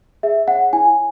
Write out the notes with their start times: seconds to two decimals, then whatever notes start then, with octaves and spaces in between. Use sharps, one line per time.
0.23 G#4 E5
0.48 C#5 F#5
0.73 E4 G#5